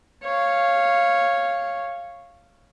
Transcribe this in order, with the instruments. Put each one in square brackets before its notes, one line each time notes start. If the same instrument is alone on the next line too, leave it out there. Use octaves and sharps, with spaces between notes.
[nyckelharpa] C#5 F5